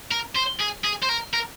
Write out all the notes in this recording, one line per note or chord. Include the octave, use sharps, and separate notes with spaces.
A#4
C5
G#4
G#4
C5
A#4
A#4